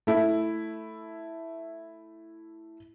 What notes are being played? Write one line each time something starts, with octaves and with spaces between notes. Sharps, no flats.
A3 E4